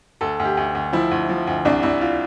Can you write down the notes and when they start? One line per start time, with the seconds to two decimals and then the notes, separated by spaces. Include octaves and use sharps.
0.21 D2 A4
0.40 D2
0.45 G4
0.57 D2
0.75 D2
0.93 F3 E4
1.11 D2
1.29 F3
1.47 D2
1.65 C2 D4
1.83 C2 E4
2.01 F4